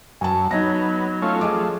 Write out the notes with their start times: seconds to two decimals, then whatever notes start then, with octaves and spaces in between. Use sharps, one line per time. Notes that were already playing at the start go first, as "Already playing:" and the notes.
0.21 F#2 G#5 A5
0.51 F#3 B3 D#4 D#5 A#6
1.22 A3 C#4 F4
1.41 F3 A3 G#4 D#5 D6